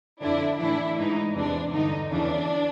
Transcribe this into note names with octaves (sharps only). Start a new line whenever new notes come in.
F2 D3 D4 E4
A2 E3 D4 E4
G#2 E3 D#4
E2 C3 E3 D4
G2 D3 D#4
E2 C#3 E3 D4